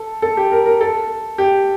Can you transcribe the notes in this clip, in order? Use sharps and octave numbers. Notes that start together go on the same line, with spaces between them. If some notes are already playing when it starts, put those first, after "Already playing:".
Already playing: A4
A4
G4
A#4
A#4
A4
G4